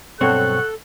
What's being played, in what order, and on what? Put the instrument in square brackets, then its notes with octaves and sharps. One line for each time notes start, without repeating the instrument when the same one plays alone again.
[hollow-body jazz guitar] B1 G2 C4 [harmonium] A4 [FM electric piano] C#5 F#5 C#6 [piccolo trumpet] F#6